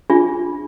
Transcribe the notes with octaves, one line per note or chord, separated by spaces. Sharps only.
D4 F4 G#4